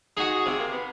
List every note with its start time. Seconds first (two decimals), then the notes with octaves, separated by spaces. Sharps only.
0.17 D#4 F#4 G#4
0.46 C3
0.59 A#3
0.72 B3